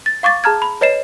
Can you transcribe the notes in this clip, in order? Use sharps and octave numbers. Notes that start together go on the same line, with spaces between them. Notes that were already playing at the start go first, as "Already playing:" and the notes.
A6
F5 C#6 D6 A6
G#4 A5 A#5 F6 G#6
B5
B4 C#5 D#5 C7 E7